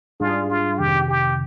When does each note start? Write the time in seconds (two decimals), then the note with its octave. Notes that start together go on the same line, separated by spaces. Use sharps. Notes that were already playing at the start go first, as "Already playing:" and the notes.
0.20 G#2 G3 D4 F4 G#4
0.50 F4
0.79 F2 C3 D#3 G4
1.08 G4